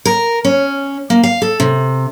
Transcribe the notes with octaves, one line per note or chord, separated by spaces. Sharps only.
A#4
C#4
A#3
F5
A4
C3